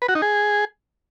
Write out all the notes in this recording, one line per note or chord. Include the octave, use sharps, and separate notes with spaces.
B4
F#4
D#4
G#4